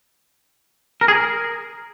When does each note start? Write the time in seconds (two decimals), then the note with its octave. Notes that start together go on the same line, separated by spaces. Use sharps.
1.01 A#4
1.08 G#4
1.15 A#4